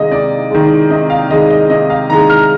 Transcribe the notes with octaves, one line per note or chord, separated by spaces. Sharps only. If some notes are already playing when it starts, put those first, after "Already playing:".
Already playing: C3 D#3 G#3 D#5 F5
C3 D5
D#3 G#3
C3 D#5
F5
D#3 G#3 D#5
D#5
C3 D#5
F5
D#3 G#3 A#5
F6